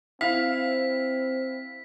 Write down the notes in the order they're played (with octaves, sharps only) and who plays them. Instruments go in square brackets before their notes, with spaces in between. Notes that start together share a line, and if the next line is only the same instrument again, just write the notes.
[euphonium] C4 [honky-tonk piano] E4 F5 [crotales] B6